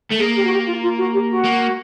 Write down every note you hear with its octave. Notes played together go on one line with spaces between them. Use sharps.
A3
A#3 G#4
G4
F#4
G4
F4
F4
F#4
G4
F#4
A#3